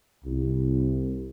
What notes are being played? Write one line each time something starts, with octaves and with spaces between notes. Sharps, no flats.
C2